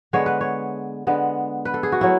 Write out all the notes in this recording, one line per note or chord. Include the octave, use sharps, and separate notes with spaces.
D3 G#3 B3 C#5
B4
C#5
D3 G#3 B3
B4
A4
G#4
F#4
F#3 A3 E4